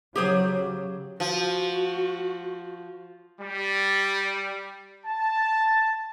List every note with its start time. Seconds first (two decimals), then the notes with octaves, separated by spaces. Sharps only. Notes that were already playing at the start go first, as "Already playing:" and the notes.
0.16 C#3 F#3 G4 G#4 C5
1.20 F3 F#4
3.41 G3
5.04 A5